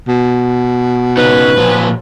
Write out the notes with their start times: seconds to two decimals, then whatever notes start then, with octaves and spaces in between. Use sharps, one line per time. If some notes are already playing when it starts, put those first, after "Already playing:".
0.08 B2
1.17 C#3 C#4 D#4 B4
1.57 A#2 F3 F#3